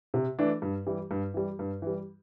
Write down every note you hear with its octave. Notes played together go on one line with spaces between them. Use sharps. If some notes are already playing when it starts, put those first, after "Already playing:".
C3
E3 A3 D4
G2
E3 G3
G2
E3 G3
G2
E3 G3